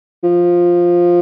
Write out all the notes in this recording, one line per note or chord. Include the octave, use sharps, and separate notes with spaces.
F3